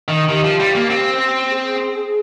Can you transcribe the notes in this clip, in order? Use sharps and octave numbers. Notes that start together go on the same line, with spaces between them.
D#3
D#3 G4
F3
G3
A#3
C4
G#4